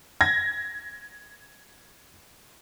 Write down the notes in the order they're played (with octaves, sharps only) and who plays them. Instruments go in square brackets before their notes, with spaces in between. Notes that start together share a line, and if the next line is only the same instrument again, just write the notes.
[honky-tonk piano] G#6 A#6